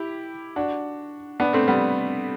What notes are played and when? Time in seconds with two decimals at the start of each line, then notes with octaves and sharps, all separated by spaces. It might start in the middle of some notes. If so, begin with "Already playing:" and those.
Already playing: E4 G4
0.56 D4 F#4
1.40 B3 D4
1.53 A3 C4
1.68 G3 B3